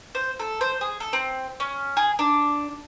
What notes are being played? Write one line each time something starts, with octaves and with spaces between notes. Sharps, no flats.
C5
A4
C5
G#4
A4
C4
C#4
G#4
D4